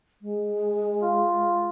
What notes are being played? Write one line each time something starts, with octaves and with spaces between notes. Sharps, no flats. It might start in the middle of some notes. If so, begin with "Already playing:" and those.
G#3
F4